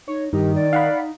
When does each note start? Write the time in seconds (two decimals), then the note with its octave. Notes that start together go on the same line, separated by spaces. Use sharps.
0.08 D#4 C#5
0.33 G2 D#3 D#4 G4
0.55 D5
0.73 D#4 F5 F#5 B5